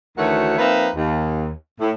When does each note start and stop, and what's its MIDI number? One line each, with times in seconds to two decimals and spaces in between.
0.18 0.55 38
0.18 0.55 51
0.18 0.55 52
0.18 0.55 57
0.18 0.55 66
0.18 0.55 73
0.58 0.89 53
0.58 0.89 58
0.58 0.89 60
0.58 0.89 63
0.58 0.89 71
0.58 0.89 76
0.96 1.50 39
1.80 1.91 45